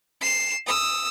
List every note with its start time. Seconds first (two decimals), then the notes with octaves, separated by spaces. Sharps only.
0.21 C7 E7
0.67 D#6 E6